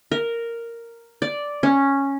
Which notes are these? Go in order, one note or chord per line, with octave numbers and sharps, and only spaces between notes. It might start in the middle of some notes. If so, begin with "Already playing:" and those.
A#4
D5
C#4